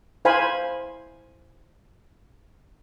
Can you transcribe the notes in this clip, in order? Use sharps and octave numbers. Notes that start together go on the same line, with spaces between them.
E4 C5 F5 G#5 B5